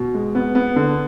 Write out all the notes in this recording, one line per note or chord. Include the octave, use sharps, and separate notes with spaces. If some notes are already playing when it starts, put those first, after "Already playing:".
Already playing: B2
G#3
B3
B3
D3